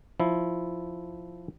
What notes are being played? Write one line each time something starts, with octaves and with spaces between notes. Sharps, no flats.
F3 E4